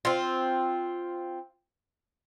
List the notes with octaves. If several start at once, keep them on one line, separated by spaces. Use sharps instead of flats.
C4 F4